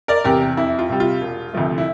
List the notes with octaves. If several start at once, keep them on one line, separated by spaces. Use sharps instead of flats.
A#4 D5
E2 C3 G4 A#4
F2 E4
F4
C3 G3
F4
E1
D2 C3 F3 A3
E4